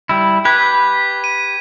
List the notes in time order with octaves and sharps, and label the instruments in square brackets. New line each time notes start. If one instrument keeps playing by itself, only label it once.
[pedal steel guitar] G3 E4
[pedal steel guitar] G4 B4 [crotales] G#6 B6
[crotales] D#7